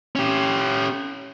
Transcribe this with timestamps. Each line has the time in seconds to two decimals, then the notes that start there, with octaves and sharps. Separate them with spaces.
0.16 C#4 G4